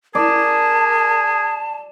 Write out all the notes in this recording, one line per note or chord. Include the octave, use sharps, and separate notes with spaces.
G#4 A#4 D5 A5